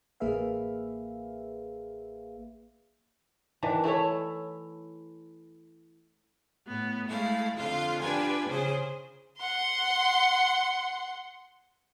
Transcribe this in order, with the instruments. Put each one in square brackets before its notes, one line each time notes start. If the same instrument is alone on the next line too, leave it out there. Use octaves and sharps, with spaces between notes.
[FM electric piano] A1 A#3 G#4 B4 E5 F5
[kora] D#3 E3 D4
A3 E4 A4 C#5
[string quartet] A2 B3
G#3 A3 E4 F5
F2 D3 F4 F5
D4 F4 G4 B4 G#5
C#3 G#4 C5
[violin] F#5 C6